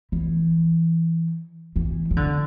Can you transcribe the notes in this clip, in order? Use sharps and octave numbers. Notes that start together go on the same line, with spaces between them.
E3
E3
E3
D3